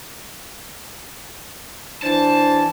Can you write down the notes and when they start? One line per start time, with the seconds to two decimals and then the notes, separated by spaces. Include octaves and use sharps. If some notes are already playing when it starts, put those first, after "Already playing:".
2.03 E3 D4 C5 A5